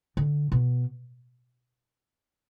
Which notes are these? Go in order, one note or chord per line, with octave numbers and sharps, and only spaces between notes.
D3
B2